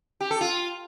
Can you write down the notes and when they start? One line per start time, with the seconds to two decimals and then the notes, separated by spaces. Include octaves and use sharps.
0.21 G4
0.31 A4
0.41 F4